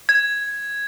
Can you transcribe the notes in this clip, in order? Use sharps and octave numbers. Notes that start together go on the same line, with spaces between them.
G#6